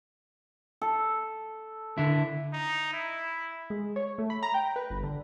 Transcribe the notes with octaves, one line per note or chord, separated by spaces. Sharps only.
A4
D3 E4
D#4
E4
G#3
C#5
A3
B5
A#5
G5
B4
G1
D3